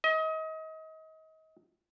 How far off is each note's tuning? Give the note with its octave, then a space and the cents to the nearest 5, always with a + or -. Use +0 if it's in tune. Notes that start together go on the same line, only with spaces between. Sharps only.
D#5 +30